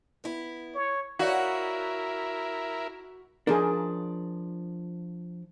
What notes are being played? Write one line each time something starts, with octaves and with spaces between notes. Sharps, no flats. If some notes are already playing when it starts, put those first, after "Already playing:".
B3 E4
C#5
E4 F#4 A#4 C#5 D5 F5
F3 D4 G#4 A#4